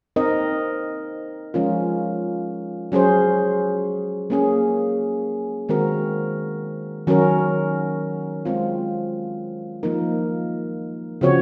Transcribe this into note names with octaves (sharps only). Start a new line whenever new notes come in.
C4 D#4 A#4 D#5
F3 G#3 C#4 F4 A#4
F#3 C#4 G#4 C5
A#3 C#4 G#4
D#3 G#3 C4 F#4 A#4
D#3 F#3 C#4 F#4 A#4
G#3 C4 F4
F3 A#3 D#4 A#4
C#3 F3 C4 F#4 C#5